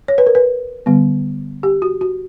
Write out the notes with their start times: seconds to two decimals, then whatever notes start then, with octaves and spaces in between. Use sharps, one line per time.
0.08 C#5
0.18 B4
0.27 A#4
0.35 B4
0.86 D3 G3 B3
1.63 G4
1.82 F#4
2.01 F#4